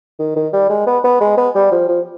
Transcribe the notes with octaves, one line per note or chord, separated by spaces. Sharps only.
D#3
D#3
G3
G#3
B3
B3
G#3
B3
G3
F3
F3